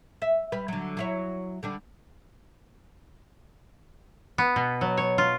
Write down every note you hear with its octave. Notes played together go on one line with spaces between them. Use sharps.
E5
G3 B4
D3 F#3
F#3 E4 C#5
D3 G3 D4
B3
B2
F#3
C#5
F4